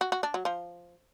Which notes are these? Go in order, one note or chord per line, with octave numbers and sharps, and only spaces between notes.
F#4
F#4
D4
F#3
F3